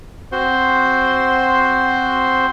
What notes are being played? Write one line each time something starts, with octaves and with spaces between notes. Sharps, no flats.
C4 F#4 C5 C6